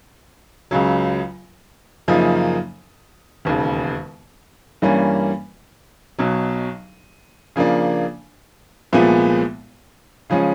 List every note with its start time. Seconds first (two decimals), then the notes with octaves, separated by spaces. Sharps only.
0.71 C#2 C#3 F#3
2.08 F#2 C#3 F3 A#3 D#4
3.45 E1 D#2 C#3
4.82 G2 E3 G3 A#3 C#4
6.19 B1 B2 F#3
7.56 C#3 F3 A#3 D4
8.93 C2 A#2 F3 G#3 B3
10.30 C#3 F3 G#3 C#4